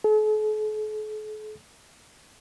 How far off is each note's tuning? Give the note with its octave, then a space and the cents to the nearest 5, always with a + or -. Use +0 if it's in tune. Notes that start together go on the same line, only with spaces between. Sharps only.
A4 -45